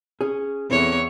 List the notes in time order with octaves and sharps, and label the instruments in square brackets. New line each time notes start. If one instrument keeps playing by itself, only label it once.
[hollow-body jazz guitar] C#4 G#4
[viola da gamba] E2 C#5 [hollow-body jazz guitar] C4 E4 A4